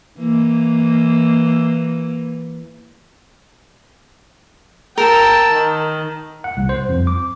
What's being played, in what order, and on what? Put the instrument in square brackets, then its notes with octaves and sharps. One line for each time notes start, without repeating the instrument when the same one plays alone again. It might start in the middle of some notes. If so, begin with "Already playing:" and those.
[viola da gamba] E3 A#3
[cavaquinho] A#4 [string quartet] G5 A5 E6
[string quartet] D#3
[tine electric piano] F#5
C2
C5
F2
D6